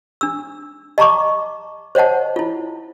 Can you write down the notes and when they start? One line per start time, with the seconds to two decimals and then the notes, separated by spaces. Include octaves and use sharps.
0.21 D4 E6
0.98 D#5 A5 A#5 C#6 D6
1.95 C5 C#5 D#5 F#5 A5
2.36 E4 F4